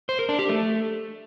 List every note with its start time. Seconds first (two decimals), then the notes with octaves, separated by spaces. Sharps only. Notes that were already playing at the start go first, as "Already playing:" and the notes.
0.09 C5
0.19 A#4
0.29 D4
0.39 G4
0.49 A3